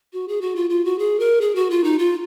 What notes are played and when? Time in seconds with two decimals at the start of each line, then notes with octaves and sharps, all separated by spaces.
0.13 F#4
0.28 G#4
0.41 F#4
0.56 F4
0.70 F4
0.85 F#4
0.99 G#4
1.20 A#4
1.41 G#4
1.55 F#4
1.70 F4
1.84 D#4
1.99 F4